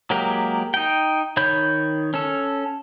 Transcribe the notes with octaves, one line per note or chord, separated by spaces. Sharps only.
F#3 G#3 A#3 G4 A#4
D#4 G5
D#3 C#5 B5 G6
C#4 A4